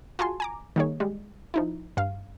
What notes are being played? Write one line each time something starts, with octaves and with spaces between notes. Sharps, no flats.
F4 F#4 G#4 G#5 A5 C6
G#5 A#5 D6
D#3 G3 A#3 D#4 G#4 C#5
G3 G#3
F3 D#4 E4
G2 F5